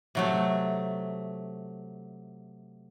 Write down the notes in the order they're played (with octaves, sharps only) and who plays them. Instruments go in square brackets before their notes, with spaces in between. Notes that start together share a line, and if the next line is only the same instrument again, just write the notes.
[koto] C3 F#3 A3